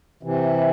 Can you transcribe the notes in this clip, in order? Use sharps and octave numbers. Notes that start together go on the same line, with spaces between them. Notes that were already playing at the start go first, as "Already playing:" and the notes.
C3 E3